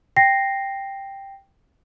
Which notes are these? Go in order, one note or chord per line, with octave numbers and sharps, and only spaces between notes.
G5 A#6 C7